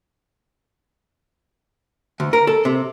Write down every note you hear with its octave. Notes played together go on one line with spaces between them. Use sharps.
D2
A#4
A4
C3